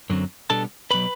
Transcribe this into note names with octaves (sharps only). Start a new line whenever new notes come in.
F#2 D3 F#3 C4
B2 G3 B3 D4 A4 A5
B2 F#3 B4 B5